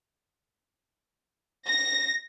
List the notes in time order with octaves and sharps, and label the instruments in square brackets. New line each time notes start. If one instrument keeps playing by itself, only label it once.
[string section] A#6